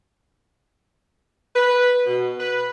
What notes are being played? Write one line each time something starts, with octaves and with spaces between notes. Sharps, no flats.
B4
B2
B4